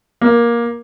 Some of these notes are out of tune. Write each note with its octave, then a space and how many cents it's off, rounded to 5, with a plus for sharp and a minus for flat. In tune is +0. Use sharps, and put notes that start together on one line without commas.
A#3 +15